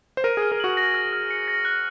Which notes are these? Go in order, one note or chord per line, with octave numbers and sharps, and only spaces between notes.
C5
A#4 D#7
G#4 F6
A#4
F#4 F#7
A#6
F6
F6
C#7
A#6
F#6